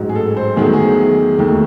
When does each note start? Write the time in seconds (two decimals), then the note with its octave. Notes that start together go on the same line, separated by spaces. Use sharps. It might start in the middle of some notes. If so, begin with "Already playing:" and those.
Already playing: A1 G#2 F#3
0.09 G#4
0.15 A4
0.37 C5
0.56 E2 D#3 F#3 A3 G#4
0.73 G#4
1.39 D#2 D#3 A3